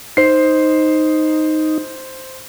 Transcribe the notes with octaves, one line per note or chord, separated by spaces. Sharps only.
D#4 C5 C7